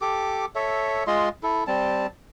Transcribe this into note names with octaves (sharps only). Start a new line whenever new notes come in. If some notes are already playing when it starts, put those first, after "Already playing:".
G4 A4 D6
A4 C#5 E5
G#3 F4 D#5 C6
E4 A4
G3 C4 A5